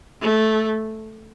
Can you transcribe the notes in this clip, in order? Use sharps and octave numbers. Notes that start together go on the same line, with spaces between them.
A3